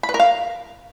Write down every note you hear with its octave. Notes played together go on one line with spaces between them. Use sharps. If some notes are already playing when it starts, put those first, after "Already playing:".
B5
B4
A#4
F5